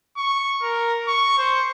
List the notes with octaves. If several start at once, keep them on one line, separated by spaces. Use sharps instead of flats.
C#6
A#4
C#6
C5